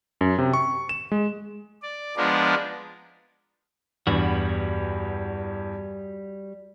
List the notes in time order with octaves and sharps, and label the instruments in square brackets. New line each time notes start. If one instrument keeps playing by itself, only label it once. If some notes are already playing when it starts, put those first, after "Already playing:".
[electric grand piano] F#2
C3
C#6
E7
G#3
[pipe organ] D5
F3 G#3 B3 D4 A#4 D5
[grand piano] E2 G2 [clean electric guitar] G3 F#4